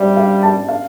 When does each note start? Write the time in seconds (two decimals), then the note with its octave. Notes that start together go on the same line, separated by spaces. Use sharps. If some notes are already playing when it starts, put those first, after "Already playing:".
Already playing: G3 C5 D5 E5
0.17 F5
0.43 A5
0.69 F5